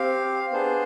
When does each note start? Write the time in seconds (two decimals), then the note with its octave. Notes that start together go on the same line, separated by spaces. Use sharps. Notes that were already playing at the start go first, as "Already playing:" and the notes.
Already playing: C4 G4 F5
0.52 B3 D4 G#4 C5